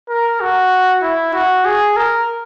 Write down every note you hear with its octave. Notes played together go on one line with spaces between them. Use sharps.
A#4
F#4
E4
F#4
G#4
A#4